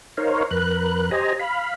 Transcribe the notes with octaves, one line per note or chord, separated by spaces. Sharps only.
D#4 A#4 C5 C#5 F5
F2 A#4 B4 F#6
G4 C5 D#5 G#5 A#5
F5 B5